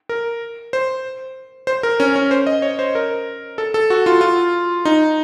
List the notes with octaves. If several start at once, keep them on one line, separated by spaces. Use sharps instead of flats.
A#4
C5
C5
A#4
C#4
C#4
C5
D#5
C#5
C5
A#4
A4
A4
F#4
F4
F4
D#4